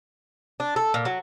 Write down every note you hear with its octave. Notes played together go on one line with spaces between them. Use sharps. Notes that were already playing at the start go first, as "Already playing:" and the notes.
D4
A4
A#2
F#3